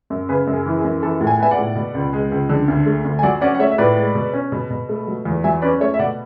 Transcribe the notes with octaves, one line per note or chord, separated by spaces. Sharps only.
F#2
C#3 G#4 B4
F#2
G#4
E3
G#4
F#2
E3 A4
A2
G#5
B3 E5 G#5
D5 F#5
A2
B2
C#2
G#3
C#2
D3
D2
A3
D2
G#5
F#3 D5 F#5
C#4 D5 F#5
F#5
A3 C#5 E5
E5
A2 B4 D5
G#3
B2
C#4
B2
B2
A3
F#3
E2
F#3 E5 G#5
C#4 B4 D5
A3 C#5 E5
E5
B2 D5 F#5